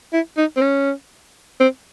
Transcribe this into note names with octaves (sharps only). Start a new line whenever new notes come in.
E4
D#4
C4
C#4
C4